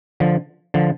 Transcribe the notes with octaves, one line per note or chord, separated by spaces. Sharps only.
D3 F3
D3 F3